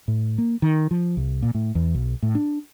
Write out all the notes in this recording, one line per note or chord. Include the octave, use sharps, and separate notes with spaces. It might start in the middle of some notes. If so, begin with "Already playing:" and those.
A2
A#3
D#3
F3
C2
A#2
A2
E2
B1
A2
D4